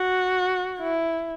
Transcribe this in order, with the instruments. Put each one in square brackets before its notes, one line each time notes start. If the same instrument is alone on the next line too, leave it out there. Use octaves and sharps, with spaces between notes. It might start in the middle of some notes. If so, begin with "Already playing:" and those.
Already playing: [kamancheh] F#4
E4